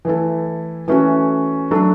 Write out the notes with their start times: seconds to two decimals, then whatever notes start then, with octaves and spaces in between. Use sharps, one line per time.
0.05 E3 A3 E4 A4
0.88 E3 A3 C#4 F#4
1.71 F#3 A3 D4 A4